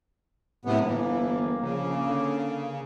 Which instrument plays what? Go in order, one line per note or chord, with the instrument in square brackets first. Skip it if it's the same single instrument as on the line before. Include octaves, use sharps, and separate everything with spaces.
[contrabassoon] F#1 [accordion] A2 C3 B3
[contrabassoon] G1 [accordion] E3 [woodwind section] A#3
[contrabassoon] A#1 [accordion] C#3
[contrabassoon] D3